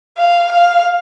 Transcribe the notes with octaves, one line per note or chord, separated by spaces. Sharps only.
F5
F5